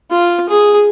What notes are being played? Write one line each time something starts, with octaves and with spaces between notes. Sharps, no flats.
F4
G#4